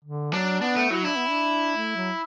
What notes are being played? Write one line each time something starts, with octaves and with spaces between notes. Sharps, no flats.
D3
F#3 D4
B3 D4
A3
F#3 E4
D4 E4
B3
D4
A3
F#3